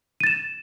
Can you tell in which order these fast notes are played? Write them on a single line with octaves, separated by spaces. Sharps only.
D#7 A6 E7